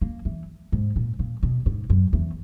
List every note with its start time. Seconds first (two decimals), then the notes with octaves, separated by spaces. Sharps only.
0.01 A#3
0.25 E3
0.72 G#2
0.96 A#2
1.19 A#2
1.43 B2
1.66 G#2
1.90 F#2
2.13 E2